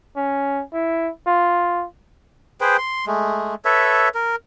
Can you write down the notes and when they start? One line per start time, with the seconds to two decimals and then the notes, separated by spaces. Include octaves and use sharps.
0.16 C#4
0.73 E4
1.27 F4
2.61 G#4 B4 C5 G5
2.78 C6
3.07 G#3 A3
3.65 A4 B4 C#5 E5
4.14 A#4